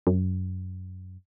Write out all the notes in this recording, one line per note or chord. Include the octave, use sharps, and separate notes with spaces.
F#2